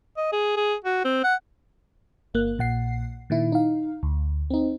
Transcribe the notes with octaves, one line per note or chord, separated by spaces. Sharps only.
D#5
G#4
G#4
F#4
C4
F#5
G1 A#3 F#6
A#1 A#2 F#5 C7
A#2 D#3 E4
D#4 F5
D2
C4 D#4